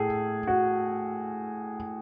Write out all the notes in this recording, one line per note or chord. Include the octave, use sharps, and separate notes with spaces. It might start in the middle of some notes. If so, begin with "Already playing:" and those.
Already playing: A2 A3 G#4
F#4